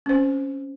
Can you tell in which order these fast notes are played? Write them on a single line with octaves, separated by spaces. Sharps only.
C#4 C5 C4